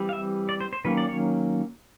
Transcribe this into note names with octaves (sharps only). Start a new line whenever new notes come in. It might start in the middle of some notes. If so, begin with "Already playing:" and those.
Already playing: E3 G3 C4
F5
E5
D5
C5
C5
D#3 F#3 A#3 C#4 B4
D5
C#5